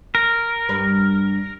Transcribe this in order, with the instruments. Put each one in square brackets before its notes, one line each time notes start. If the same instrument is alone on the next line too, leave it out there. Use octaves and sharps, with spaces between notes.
[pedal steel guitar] A#4
[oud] G2 G3 B4